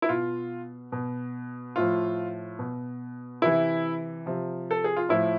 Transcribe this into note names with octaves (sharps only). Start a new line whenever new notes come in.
E4
B2 F4
B2
A2 F3 F4
B2
C3 E3 E4
C3 F3
A4
G#4
F4
A2 F3 E4